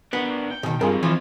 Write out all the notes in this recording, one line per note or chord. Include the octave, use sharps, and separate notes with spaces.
B3 D4 A#4
G5
B2 D#3
G2 C4 D#4 F4 G#4 A#4
E3 F3 F4 G#6